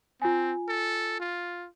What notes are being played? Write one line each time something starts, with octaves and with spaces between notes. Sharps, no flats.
C4 F4 G#5
A4
F4